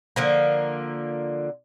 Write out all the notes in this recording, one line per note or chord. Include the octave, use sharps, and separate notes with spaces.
D3 F3 A#3